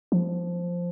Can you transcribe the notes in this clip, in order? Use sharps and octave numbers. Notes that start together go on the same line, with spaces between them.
F3